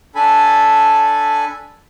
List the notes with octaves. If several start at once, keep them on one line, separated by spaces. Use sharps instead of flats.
D4 A4 G#5 B5